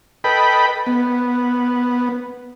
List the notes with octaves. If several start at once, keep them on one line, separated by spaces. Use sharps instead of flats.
A4 B4 D#5 G5 B5
B3